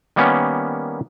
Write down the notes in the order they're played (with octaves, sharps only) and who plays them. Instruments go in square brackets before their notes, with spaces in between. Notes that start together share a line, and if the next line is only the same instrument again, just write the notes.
[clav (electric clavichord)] D#3 G3 A#3 B3 C#4